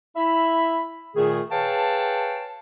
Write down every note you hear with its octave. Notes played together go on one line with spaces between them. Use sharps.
E4 E5 B5
A#2 D#3 A3 G#4
G#4 B4 C#5 F5 G5 A5